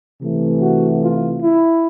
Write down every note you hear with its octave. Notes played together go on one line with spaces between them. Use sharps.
C3 E3 A3
F#4
F4
E4